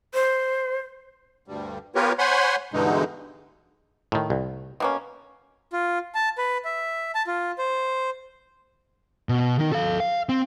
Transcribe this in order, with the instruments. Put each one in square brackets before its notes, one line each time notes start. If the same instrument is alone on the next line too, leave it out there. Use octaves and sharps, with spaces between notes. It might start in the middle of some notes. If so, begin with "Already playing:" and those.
[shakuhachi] C5
[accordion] D2 G2 G3
B3 F4 G4 A#4 B4 C#5
C5 C#5 F#5 G#5 B5 C6
G2 B2 D3 E3 G#3 D#4
[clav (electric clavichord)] A2 D#3
C2
[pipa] B2 A#3 C#4
[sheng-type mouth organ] F4
A5
B4
E5
A5
F4
C5
[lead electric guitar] B2
D#3 D#4
A4 F5
F5
C4